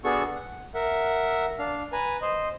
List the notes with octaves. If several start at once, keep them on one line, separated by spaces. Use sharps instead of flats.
B3 D4 F#4 G#4 A4 C#6
F#5
A#4 E5 F#5
D4 F5
B4 G#5 A#5
C5 D#5